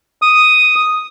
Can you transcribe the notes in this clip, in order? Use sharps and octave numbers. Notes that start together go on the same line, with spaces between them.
D#6